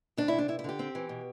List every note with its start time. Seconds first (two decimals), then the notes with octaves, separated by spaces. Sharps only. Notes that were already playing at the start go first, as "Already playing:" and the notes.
0.17 D2 D4
0.28 E4
0.33 C3
0.38 D4
0.48 G2 E4
0.59 E4
0.64 D3 G4
0.79 C4
0.95 E3
1.09 B2